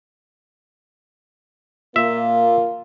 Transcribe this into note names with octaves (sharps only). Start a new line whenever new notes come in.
A#2 A#3 F4 E5